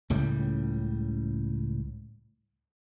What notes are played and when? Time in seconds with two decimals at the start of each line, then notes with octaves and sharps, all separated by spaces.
0.10 C#2 A2 C#3 G3